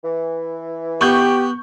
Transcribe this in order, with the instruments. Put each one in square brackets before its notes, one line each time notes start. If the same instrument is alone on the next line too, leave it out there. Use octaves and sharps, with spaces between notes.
[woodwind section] E3
[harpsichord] B3 [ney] G4 [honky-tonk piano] C#6 G6